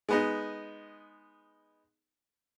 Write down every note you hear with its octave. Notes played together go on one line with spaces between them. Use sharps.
G#3 B3 D#4